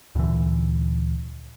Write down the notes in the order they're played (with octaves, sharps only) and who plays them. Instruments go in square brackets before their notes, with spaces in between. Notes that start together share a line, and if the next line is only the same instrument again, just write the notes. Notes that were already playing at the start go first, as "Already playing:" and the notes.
[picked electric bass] D2 A#2 D3 E3